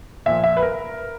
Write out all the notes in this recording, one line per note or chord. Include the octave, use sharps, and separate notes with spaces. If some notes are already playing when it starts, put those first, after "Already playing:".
A#2 F3 E5
E5
B4
A#4